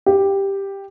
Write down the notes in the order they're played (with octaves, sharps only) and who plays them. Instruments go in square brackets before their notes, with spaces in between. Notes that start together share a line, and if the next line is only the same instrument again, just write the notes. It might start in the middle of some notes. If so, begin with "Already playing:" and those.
[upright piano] G4